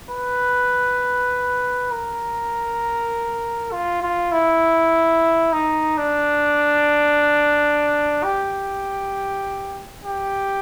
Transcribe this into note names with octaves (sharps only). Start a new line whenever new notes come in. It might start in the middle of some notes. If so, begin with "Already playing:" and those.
B4
A#4
F4
F4
E4
D#4
D4
G4
G4